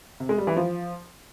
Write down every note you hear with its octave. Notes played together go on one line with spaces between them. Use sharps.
C3
G#3
G3
E3
F3